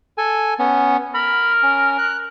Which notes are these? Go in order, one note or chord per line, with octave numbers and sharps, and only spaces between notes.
A4 G#5
B3 C#4
A#4 B5
C#4
F#6